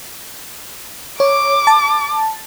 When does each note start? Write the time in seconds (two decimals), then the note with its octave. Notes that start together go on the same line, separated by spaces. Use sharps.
1.20 C#5 D6
1.67 A5